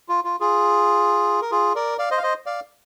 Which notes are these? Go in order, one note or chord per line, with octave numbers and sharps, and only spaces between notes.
F4
F4
F4 G#4
A#4
F4 G#4
A#4 D5
D5 F5
C5 D#5
F5
C5 D#5
D5 F5